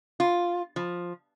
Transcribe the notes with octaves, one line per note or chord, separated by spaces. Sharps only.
F4
F3